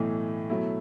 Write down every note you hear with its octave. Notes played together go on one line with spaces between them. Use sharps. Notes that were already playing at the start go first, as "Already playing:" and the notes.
Already playing: B1 A2 E3 A3
B2 F#3 A3 E4